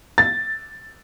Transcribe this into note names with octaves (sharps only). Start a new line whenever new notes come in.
A6